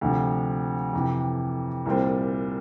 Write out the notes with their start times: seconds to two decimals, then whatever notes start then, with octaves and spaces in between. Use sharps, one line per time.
0.01 D2 C3 F3
0.93 F2 C3 E3
1.86 C2 A#2 G3 C4